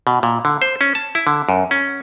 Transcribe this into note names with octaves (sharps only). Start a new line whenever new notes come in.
B2
A#2
D3
C5
C#4
A5
E4
D3
F#2
C#4